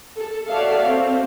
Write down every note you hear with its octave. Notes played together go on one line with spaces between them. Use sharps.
A4
F#4 A4 C#5 D5 E5 F5
C4